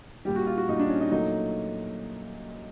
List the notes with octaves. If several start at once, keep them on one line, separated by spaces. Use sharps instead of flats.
A#2 G3 G4
F#4
F4
F#4
A#2 G3 D#4
D4
C#4
D#4
A#2 F#3 A3 D#4